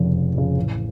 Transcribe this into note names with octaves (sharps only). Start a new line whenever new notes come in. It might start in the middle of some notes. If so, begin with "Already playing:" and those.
Already playing: F1 F2 C#3
F1
F2 C#3
A1